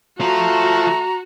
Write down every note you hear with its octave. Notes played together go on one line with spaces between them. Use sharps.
F3 A3 F4 F#4 A#5